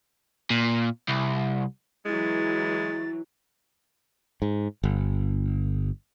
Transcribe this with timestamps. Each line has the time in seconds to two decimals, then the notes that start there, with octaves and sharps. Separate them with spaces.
0.50 A#2
1.08 C2
2.06 E3 F#3 G#3 E4 A6
4.42 G#2
4.84 G1